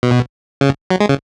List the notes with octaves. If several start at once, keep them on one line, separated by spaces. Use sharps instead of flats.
B2
C#3
F#3
G#3
C#3